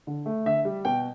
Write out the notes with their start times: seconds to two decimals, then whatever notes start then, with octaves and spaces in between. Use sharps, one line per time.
0.07 D3
0.26 A3
0.46 D3 E5
0.65 G3
0.85 B2 G5